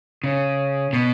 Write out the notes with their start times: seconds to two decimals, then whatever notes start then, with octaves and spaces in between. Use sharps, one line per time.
0.24 C#3
0.93 B2